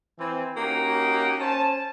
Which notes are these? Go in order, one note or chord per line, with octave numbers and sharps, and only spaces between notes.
E3 C4
A#3 C#4 D#4 F#4 G4
C#4 C5 A5